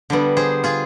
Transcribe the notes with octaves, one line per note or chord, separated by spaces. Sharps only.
D3 G3 B3
G#4 C5
F4 G#4